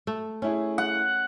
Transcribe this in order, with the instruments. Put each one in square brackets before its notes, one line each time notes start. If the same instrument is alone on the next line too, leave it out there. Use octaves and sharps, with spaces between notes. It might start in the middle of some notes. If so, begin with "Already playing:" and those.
[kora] A3
[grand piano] A3 E4 G#4 [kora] C#4
[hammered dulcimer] F#5